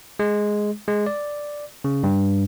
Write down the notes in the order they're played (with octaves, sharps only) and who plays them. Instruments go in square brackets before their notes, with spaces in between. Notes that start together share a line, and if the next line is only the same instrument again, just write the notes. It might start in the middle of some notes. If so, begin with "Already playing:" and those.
[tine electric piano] G#3
G#3
D5
C#3
G2